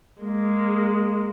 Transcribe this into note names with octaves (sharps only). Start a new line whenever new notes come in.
G#3 A#3